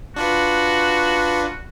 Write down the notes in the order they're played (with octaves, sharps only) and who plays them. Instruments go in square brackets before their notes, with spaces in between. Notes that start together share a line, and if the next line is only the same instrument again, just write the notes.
[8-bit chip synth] D4 F4 B4 [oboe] F#4